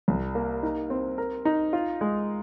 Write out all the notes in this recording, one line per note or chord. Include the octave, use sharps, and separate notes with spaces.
C2
A#3
D#4
C4
A#4
D#4
F4
G#3